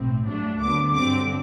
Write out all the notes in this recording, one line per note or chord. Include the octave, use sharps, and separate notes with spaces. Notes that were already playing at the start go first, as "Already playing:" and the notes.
Already playing: B1 A2 C4
G2 F#3 A3 D4
D2 D3 F#3 B3 D6
G2 D3 F#3 C4 D6